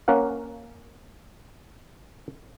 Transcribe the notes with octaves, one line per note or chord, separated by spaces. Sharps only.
A#3 C#4 A#4 F5 F#5